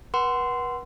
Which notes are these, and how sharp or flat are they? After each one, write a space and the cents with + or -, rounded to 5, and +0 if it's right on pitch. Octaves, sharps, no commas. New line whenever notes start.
B4 -35 F#5 +15 C6 -15